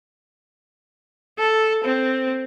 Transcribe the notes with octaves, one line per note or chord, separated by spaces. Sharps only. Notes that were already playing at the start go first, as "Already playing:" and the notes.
A4
C4